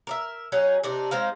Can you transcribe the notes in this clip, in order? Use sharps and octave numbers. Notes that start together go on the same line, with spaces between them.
A#4 D5 E5
F#3 C#4 D#4 G#4
C3 D4 D#4
G#3 C4 D#4 F5